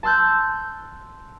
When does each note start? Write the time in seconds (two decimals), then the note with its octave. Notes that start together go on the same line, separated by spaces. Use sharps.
0.03 A5 C6 E6 F#6 G6